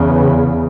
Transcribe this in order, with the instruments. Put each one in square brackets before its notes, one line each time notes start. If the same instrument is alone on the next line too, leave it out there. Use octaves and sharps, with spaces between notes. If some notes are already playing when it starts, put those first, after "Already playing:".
Already playing: [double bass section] E2 C#3